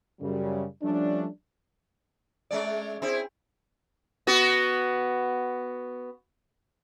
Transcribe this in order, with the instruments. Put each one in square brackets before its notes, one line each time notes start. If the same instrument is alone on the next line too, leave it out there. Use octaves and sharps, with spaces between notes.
[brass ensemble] F#2 C#3 G3
F3 G3 A3 C#4 D4
[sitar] G#3 C#4 D5
C4 E4 G#4
B3 F#4